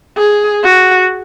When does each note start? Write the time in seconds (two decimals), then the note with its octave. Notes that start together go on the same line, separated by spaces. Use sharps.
0.17 G#4
0.64 F#4